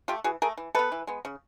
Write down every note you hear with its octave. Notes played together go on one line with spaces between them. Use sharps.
A3 F4 G4
E3 F#4 G#4
A3 G#4 A#4
E3
G#3 B3 A4 B4
E3
G#3 B3
C#3